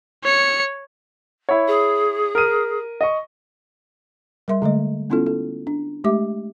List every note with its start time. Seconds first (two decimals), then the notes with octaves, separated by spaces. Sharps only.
0.24 C#5 C#7
1.49 E4 C#5
1.67 G#4
2.35 A#4 D#7
3.01 D#5 C#6
4.48 G3 A#4 E5 C6
4.62 D3 G#3 A3 D#5
5.10 B3 C#4 E4 F4 A4
5.26 A4
5.67 D4
6.04 G#3 A3 G4 E5 D6